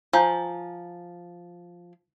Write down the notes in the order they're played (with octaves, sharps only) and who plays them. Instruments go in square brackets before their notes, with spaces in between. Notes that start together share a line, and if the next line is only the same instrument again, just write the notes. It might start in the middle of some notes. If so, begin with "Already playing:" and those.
[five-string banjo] F3 [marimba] G#5 A#5 G6